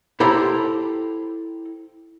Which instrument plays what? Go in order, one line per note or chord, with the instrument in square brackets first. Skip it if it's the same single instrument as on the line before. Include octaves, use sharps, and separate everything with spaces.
[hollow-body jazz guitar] E4 G4 A4 C5 A#5